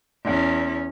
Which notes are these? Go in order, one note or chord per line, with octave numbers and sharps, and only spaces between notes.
E2 C#4